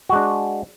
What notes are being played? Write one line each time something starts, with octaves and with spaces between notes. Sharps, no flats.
G#3 D4 F#4